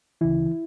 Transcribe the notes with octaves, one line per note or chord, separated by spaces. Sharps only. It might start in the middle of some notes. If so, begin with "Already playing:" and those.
D2 C#3 E3 E4